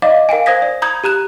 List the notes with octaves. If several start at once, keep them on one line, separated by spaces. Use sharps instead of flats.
D5 D#5 F5 D6
A#4 F5 G5 G#5
C5 F5 D#6 G#6 A#6 B6
D5
A#5 B5 D#6 G6 G#6
G4 A#5 F#6 E7